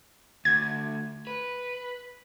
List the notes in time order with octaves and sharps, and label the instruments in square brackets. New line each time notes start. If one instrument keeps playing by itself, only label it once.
[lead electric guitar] D2 [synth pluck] G#6
[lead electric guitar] B4